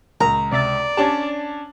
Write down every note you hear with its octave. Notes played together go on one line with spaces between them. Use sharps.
C#2 A#2 A#4 A#5
C3 D5 E5 A6
C#4 D4 G4 A5